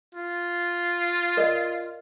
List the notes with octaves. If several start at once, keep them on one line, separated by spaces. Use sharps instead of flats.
F4
A#4 D5 D#5